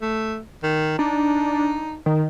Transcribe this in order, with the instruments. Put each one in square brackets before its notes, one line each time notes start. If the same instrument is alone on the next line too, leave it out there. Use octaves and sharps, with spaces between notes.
[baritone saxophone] A3
D#3
[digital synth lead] D4 [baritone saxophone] D#4
[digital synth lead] D#3